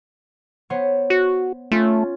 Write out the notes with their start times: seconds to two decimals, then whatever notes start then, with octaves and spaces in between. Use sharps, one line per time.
0.70 B3 C5 C#5
1.10 F#4
1.72 A3 C#4 F4